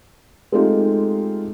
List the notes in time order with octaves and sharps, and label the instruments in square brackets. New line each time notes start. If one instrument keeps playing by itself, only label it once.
[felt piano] G#3 A3 C4 D#4 F4 G4